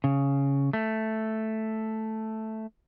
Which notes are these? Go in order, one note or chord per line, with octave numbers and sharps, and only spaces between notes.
C#3
A3